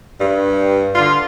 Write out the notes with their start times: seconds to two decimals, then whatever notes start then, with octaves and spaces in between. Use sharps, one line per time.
0.19 G2
0.94 D3 F4